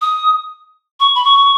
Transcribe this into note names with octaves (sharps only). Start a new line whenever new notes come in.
D#6
C#6
B5
C#6